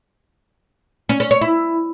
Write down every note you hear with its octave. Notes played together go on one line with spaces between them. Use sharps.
C#4
C#4
C#5
E4